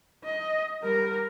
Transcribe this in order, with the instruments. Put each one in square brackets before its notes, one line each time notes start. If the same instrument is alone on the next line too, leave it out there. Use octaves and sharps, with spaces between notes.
[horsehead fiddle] D#5
G3 A#4